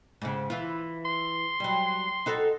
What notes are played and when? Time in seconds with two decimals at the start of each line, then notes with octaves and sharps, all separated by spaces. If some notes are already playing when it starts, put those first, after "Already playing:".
0.22 G#2 C#3
0.50 E3 F4
1.05 C6
1.60 F#3 G3
2.26 D#4 F#4 A4